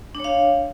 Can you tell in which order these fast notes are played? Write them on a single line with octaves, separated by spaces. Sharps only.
D4 C#5 F5